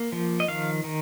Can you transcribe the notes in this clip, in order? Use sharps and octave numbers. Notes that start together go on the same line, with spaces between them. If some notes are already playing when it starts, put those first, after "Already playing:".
Already playing: A#3
F3
D#5
D#3 F5
D#3